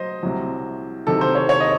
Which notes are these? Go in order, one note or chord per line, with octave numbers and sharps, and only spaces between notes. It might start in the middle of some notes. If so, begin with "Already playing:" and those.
Already playing: F#3 C5 D#5
C2 C3 F#3
C3 D#3 F#3 A4
C5
C#5
C#5
D#5